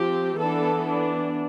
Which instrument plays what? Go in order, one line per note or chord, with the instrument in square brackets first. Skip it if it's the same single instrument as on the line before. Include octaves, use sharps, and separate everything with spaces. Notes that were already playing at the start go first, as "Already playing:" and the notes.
Already playing: [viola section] F3 C4 G4
E3 B3 D4 A4
D4